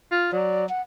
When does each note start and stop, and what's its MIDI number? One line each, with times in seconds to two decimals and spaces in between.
0.11 0.28 65
0.32 0.65 54
0.32 0.66 74
0.69 0.81 78